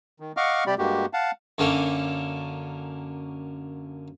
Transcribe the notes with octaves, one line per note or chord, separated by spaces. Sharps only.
D#3
D#5 F5 F#5 C#6 D6 F6
C3 G3 G4 D5 B5
G2 G#3 A#3 F#4 G4
F5 F#5 A5
F#2 D3 A#3 C#4 A4 A5